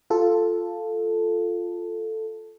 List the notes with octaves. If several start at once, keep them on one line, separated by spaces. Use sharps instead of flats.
F4 A4